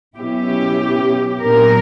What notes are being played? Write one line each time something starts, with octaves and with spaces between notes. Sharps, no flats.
B2 F#3 C#4 E4 G4
A#2 F#3 B3 D4 A#4